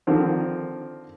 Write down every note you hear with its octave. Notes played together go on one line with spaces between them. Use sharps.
D3 D#3 F3 C4